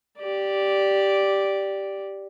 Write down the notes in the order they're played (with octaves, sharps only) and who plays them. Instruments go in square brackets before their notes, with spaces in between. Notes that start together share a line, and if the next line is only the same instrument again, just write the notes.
[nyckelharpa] G4 D5